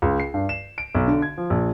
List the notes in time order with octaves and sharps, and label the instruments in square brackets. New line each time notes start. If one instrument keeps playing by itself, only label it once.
[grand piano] C#2
C7
G2
E7
D7
B1
D3
G#6
F3
A#1